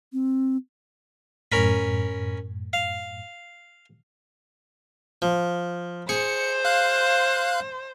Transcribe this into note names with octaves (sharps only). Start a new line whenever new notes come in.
C4
F#2 A2 C#4 A#4 B5
F5
F3
G#4 C5 C#7
F5 F#6